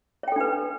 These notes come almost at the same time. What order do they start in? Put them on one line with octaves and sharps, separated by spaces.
C#5 G5 A4 D4 B4